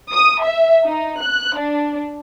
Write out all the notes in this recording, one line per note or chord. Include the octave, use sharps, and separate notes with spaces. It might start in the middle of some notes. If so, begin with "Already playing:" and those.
D#6
E5
D#4
F#6
D4